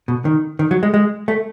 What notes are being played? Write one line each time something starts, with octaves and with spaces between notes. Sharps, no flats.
B2
D#3
D#3
F#3
G#3
G#3
A3